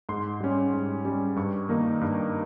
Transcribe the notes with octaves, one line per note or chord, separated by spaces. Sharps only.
G#2 C6
G3 C#4
G#2
G3 C#4
G2 C#6
D#3 A#3 D#4
G2